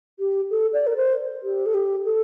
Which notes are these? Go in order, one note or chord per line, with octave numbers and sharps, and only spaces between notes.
G4
A4
D5
A#4
C5
G4
A4
G4
A4